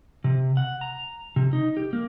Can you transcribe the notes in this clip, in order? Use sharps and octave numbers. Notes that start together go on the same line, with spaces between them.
C3
F#5
A#5
C3
D#4
G4
A#3